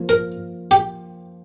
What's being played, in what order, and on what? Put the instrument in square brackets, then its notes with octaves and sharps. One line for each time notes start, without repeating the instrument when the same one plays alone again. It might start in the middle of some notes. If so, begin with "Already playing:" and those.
Already playing: [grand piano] F3 A#3 F4
[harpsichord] A#4
G4